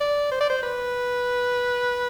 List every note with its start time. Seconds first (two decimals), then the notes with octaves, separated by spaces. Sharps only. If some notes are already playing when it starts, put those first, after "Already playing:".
0.01 D5
0.32 C5
0.41 D5
0.50 C5
0.63 B4